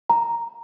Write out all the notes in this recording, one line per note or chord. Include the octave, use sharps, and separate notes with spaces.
A#5